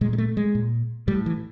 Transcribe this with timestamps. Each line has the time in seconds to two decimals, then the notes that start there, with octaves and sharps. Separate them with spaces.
0.01 A#2 G#3
0.13 G#3
0.18 A3
0.37 G#3
0.55 A#2
1.08 A2 G3
1.26 E3